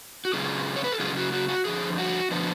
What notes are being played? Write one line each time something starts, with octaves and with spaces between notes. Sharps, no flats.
F#4
C#3 F#3 C#4 F4 G#4
C#5
B4
A4
C#3 F#3 C#4 F4 G#4
F#4
F#4
F#4
F2 D3 F3 G#4
F#4
D3 F3 B3 D4